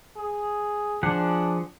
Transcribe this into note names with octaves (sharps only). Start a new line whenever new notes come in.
G#4
F3 D4 G#4 F#5